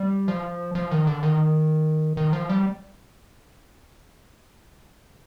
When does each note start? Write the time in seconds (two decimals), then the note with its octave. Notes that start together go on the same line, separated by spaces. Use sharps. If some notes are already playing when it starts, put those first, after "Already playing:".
Already playing: G3
0.28 F3
0.75 F3
0.91 D#3
1.07 D3
1.23 D#3
2.17 D#3
2.33 F3
2.49 G3